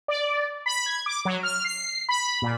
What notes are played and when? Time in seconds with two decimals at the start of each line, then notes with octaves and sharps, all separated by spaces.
0.08 D5
0.66 B5
0.86 G#6
1.06 D6
1.25 F#3
1.43 F6
1.64 C7
2.09 B5
2.42 A#2